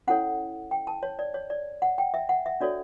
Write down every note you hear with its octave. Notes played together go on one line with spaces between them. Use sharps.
C#4 E4 A4 C#5 F#5
G5
A5
C#5
D5
C#5
D5
F#5
G5
E5
F#5
E5
D4 F#4 A4 C#5 D5